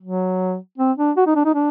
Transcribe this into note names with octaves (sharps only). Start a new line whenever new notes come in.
F#3
C4
D4
F#4
D#4
D4
D#4
D4